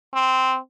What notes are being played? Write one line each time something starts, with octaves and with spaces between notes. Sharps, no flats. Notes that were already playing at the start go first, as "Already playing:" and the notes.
C4